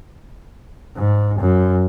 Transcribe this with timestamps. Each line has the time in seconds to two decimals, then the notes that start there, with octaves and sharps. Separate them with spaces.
0.96 G#2
1.40 F#2